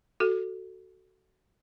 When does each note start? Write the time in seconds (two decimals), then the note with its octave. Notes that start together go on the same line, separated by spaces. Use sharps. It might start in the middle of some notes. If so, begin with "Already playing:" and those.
0.20 F#4 A4